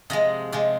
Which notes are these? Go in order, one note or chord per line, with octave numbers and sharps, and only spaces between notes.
C3 F3 G#3 D#5
C3 F3 G#3